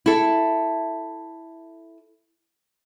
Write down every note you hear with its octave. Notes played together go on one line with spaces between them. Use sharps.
E4 A4